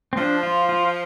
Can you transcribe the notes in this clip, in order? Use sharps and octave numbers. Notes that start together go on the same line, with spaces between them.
C4
F3 D4
F4
F4